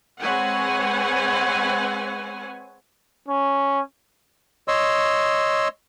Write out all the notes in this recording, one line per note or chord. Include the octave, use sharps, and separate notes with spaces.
G#3 C4 B4 C#5 F#5 G#5
C#4
C#5 D#5 C6 E6